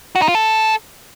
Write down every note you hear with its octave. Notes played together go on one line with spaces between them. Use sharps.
F#4
D#4
F4
A4